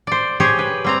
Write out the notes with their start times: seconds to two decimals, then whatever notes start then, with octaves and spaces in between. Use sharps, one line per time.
0.07 C5 D5
0.40 G4 G#4 C5 C#5
0.59 B4
0.84 G3 C4 A#5